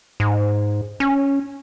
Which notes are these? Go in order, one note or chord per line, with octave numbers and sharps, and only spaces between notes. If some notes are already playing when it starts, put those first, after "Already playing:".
G#2
C#4